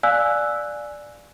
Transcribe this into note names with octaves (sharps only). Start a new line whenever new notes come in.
D5 F5 G#5 E6 F#6